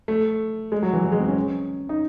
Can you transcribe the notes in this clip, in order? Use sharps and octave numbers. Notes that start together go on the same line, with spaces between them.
A3
G#3
F#3
E3
E3
G#3
C4
C#4
D#4